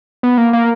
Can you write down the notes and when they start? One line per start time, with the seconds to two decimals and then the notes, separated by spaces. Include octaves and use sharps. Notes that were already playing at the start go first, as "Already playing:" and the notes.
0.23 B3
0.38 A#3
0.53 A#3